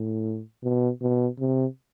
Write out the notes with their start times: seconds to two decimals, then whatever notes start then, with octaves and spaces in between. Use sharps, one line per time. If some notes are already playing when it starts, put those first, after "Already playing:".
Already playing: A2
0.63 B2
1.01 B2
1.39 C3